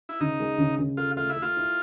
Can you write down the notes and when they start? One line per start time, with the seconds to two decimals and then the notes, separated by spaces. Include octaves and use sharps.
0.09 E4
0.20 C#3 D#4
0.40 G#3
0.58 C#3
0.79 C#3
0.97 F4 A4
1.17 A3 F4
1.30 E4
1.37 A3
1.42 F4
1.57 E4